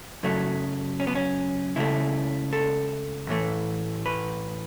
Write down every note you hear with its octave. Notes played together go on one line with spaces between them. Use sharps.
F#2 C#3 F#3 A3
C#4
B3
C#4
C#2 C#3 A3 E4
A4
A2 E3 A3
B4